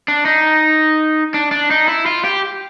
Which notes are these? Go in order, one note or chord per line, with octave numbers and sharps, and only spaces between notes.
D4
D#4
D4
D4
D#4
E4
F4
G4